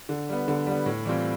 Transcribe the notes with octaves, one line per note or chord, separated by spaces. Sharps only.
D3
G3 B3
D3
G3 B3
A2
E3 G3 C4 F4